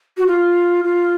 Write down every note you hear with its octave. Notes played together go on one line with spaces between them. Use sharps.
F#4
F4
F4